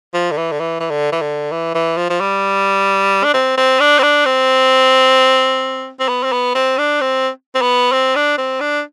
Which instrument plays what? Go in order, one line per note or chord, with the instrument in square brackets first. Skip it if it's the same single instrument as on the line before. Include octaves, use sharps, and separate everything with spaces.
[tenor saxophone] F3
D3
E3
D3
E3
E3
D3
E3
D3
E3
E3
F3
F3
G3
D4
C4
C4
D4
C4
D4
C4
C4
B3
C4
B3
C4
D4
C4
C4
B3
C4
D4
C4
D4